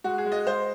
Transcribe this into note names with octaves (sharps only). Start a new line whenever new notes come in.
G#3 F#4
G#4
G#3
D#5
G#3 C5